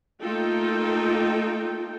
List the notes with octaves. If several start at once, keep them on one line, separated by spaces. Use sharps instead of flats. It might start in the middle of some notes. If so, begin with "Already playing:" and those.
A3 A#3 D#4 F4 A4 G5